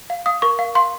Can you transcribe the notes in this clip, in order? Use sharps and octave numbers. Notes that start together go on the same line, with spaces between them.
F5
F5 D#6
A#4 C#6
F5
F5 C6